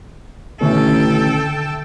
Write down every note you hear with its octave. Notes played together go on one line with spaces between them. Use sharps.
A1 B2 D3 D#3 C#4 A4 E5 G5